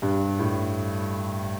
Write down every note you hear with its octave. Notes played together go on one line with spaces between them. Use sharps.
G2
A2